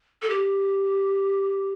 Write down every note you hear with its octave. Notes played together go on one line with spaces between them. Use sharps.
A4
G4